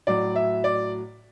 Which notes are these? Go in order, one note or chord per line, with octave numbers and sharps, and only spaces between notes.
A2 F#3 D5
E5
D5